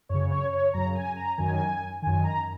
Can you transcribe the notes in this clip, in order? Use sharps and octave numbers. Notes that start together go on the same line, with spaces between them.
F#2 C#3 C#5
C#5
C#5
F#2 C#3 A#5
G#5
A#5
F#2 D#3 G#5
F#2 D#3 G#5
A#5